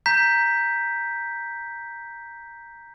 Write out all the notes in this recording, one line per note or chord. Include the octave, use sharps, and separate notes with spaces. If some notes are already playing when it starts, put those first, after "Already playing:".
A#5 G6 B6